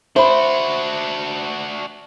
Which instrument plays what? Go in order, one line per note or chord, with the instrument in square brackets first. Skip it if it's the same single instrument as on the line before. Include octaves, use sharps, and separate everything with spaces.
[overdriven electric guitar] D4 F#4 [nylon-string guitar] C5 [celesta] E5 B5